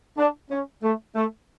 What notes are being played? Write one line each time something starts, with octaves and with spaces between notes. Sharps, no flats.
D4
C#4
A3
A3